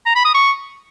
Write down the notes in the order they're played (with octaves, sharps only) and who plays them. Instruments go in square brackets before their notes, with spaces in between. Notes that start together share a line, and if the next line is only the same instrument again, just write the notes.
[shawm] A#5
B5
D#6
C#6